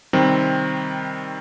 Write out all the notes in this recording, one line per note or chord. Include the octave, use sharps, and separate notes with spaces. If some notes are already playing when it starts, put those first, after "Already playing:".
C3 D#3 G3 C4